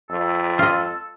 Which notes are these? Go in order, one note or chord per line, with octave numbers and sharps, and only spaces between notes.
F2 A4
F4 D#5